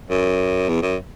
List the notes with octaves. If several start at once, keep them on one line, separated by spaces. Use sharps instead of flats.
F#2
E2
F#2